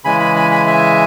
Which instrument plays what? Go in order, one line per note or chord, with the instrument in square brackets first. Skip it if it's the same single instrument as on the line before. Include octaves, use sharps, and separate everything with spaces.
[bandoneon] C#3 E3 G#3 G#5 B5
G#5 B5
G#5 B5
G#5 B5
E5 G#5